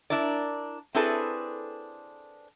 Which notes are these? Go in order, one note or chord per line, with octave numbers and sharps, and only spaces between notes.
D4 E4 A#4 D5
C4 D4 E4 G#4 A4 B4